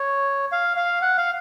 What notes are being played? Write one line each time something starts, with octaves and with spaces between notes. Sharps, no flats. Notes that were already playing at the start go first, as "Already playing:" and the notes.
Already playing: C#5
F5
F5
F#5
F5